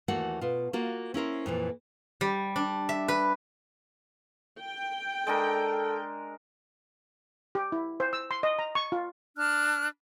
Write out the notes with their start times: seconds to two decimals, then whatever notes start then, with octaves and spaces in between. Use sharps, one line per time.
0.08 D#2 E3 A3 A#3 F#4 F#5
0.41 B2 F4
0.73 A#3 F4 F#4
1.14 C#4 E4 A#4 C5
1.46 F2 A#2 E3
2.21 G3
2.56 D4
2.89 E5
3.08 B4
4.59 G5
5.27 G#3 D4 A4 A#4
7.55 G4
7.72 E4
8.00 C5
8.13 E6
8.31 C6
8.43 D#5
8.59 A#5
8.75 C#6
8.92 F4
9.37 D4 A5 F6 F#6